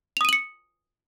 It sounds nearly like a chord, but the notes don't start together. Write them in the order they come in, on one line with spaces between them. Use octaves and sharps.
F7 D#6 D#7 F#7 C#7